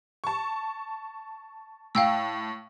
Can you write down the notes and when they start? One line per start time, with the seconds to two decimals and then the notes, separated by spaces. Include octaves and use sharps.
0.24 A5 C#6
1.95 A2 F5 G5 E6